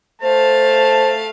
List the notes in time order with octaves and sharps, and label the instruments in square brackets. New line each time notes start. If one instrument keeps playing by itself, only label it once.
[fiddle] A3 F5 [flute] C5 [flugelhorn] A5